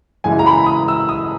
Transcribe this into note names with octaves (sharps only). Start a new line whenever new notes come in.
F#2 C#3 E3 G#3 G#5
A#5
B5
D#6
E6
D#6